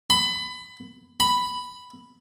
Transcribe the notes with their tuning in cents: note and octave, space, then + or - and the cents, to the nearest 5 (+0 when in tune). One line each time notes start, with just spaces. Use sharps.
B5 +25
B5 +5